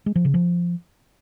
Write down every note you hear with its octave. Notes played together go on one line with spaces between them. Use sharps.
G#3
F3
C#3
F3